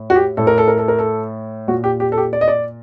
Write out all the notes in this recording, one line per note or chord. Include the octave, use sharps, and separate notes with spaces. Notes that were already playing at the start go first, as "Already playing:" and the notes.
Already playing: A2
F#4
G4
A2 A4
A#4
A4
A#4
A4
A#4
A4
A#2 F#4
G4
G4
A4
G4
D5
D#5
D5